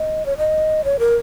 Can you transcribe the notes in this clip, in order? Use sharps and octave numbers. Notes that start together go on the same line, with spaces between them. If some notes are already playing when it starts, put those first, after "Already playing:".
Already playing: D#5
C#5
D#5
C#5
A#4